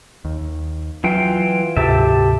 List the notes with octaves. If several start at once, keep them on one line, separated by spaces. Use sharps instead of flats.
D#2
E3 F#3 F4 G5
D2 G#2 C3 G4 A4 E5